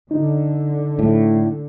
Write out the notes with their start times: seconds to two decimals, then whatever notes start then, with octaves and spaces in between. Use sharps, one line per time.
0.11 D3 D#4
0.99 A2